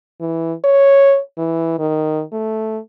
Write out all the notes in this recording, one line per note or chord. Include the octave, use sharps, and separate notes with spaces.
E3
C#5
E3
D#3
A3